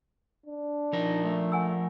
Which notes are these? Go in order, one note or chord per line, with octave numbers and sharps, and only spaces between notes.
D4
F3 D#4 A#4
A3
F#5 G#5 E6